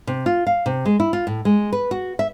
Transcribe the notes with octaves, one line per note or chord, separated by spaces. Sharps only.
C3
F4
F5
C3
G#3
E4
F4
A2
G#3
B4
F#4
E5